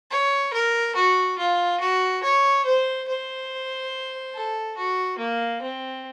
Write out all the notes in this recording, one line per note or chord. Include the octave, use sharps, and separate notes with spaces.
C#5
A#4
F#4
F4
F#4
C#5
C5
C5
A4
F#4
A#3
C4